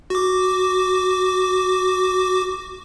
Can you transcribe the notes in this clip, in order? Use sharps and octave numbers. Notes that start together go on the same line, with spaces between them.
F#4 D6